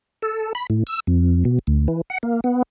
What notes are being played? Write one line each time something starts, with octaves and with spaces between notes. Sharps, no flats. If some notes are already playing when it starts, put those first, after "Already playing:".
A4
B5
A2
E6
F2
B2
D2
E3
F#5
A#3
B3